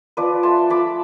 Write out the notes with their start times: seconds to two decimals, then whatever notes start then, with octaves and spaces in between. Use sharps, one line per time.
0.17 F3 B4 D5
0.43 A3 A5 C6
0.70 F3 B5 D6